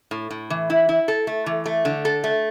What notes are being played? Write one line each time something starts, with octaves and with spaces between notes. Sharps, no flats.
A2
A2
E3
E4
E4
A4
A3
E3
A3
D3
A4
A3